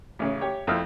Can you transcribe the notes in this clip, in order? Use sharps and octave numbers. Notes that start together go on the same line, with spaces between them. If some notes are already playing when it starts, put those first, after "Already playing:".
A1 C#3
G4 C#5
F2 C4 E4 E6 F6